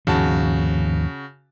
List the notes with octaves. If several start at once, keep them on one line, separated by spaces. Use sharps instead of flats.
D#2 G#2 C#3 F3 F#4 A5